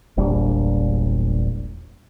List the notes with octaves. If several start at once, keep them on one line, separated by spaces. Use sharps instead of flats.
E1 A#1 G3 D4